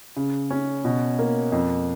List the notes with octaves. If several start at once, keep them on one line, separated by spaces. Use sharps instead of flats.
C#3
C#4
B2
A#3
F2